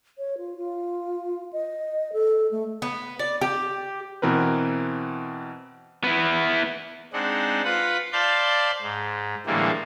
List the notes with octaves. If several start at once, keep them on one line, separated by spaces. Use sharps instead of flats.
C#5
F4
F4
D#5
A4
A3
B3
D5
G4
B2 E3 C4 A#4 B4
B3 E4
G#3 C4 D4 D#4 F#5
F4 B4 F#5 B5
C5 D5 F5 A5 B5 G6
G#2
A2 D3 E3 G3 G#3 A#3